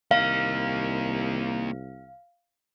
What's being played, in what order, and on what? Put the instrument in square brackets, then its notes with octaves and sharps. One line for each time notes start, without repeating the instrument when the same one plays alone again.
[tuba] C2 [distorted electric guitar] A#3 D#4 [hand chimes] F5